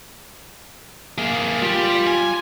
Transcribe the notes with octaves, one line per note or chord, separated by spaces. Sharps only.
A#3 G#4
G3 F4 G4
G#5